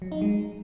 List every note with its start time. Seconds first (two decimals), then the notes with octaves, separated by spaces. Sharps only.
0.02 F#3
0.12 D#4
0.22 G#3